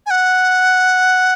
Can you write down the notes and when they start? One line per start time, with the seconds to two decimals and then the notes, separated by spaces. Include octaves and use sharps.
0.06 G#5
0.11 F#5